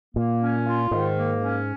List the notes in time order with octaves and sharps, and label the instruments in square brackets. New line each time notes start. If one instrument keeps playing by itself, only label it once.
[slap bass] A#2 [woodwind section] A#3
[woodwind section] C#4
F4
[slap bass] G#2 [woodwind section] D#3
[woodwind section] A#3
C#4